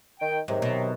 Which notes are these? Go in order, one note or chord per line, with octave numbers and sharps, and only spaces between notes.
D#3 G5
G#2 C3 D#3 F#3
B2